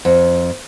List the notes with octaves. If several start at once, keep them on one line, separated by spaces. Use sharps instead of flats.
F2